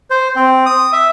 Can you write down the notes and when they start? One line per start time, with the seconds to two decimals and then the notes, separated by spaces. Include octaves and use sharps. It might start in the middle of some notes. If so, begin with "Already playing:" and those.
0.10 C5
0.36 C4
0.66 D#6
0.93 E5